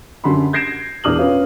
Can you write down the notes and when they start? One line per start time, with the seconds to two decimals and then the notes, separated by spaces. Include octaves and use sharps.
0.24 F#2 D3 F#4 G4 B5 C6
0.53 G6 G#6 A#6 C7 D7 E7
1.04 E1 E2 D4 D#6 F6 F#7
1.19 C#4 F4 B4 C#5 F5